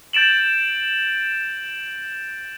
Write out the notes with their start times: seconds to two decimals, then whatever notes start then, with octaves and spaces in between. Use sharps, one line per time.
0.13 G6 A6 D7 E7 F#7